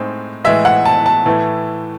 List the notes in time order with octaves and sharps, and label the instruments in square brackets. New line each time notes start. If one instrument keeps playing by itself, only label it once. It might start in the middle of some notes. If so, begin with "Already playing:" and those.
Already playing: [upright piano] A2 G#3 C4 D#4
A2 E3 G#3 E5
F#5
A5
A5
A2 E3 A3